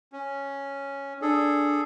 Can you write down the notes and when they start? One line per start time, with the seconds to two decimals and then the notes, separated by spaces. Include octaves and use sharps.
0.13 C#4
1.22 D4 G#4 A4